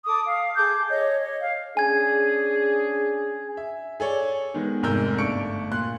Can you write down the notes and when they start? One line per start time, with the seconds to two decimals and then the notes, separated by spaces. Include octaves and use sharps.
0.06 A4 D6 D#6
0.25 F5
0.57 G#4 A4 D6 G6
0.89 C#5 D#5
1.20 C#5
1.41 F5
1.77 C#4 D4 G#4 G#5 G#6
3.57 E5
4.00 G#4 A4 C#5 D5
4.54 D#3 G#3 B3
4.83 F1 G#2 A#4 E6 G6
5.18 G1 A3 D4 C#6 C#7 D7
5.72 A#2 C6 F#6